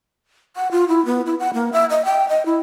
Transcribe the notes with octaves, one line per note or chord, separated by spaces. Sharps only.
F#5
F4
E4
B3
E4
F#5
A#3
E5
D#5
G5
D#5
E4